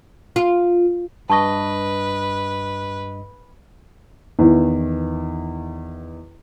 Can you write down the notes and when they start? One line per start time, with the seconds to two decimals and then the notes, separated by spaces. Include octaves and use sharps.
0.36 F4
1.30 G2 B4 D#5 A5 C#6
4.39 E2 D#3 E3